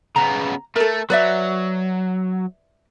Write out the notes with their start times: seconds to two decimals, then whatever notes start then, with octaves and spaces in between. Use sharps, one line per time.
0.16 C#3 B3 A#5
0.76 A3 A4 A#4
1.10 F#3 B4 D5 E5